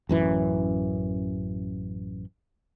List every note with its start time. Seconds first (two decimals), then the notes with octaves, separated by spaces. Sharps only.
0.09 A1 F#2 E3